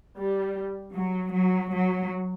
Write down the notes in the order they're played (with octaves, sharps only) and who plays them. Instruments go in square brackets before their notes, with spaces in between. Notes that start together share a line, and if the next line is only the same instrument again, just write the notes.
[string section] G3
F#3
F#3
F#3